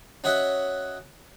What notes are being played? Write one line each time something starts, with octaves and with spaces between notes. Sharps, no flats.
C#4 F#4 C#5 D#5 E5 F#5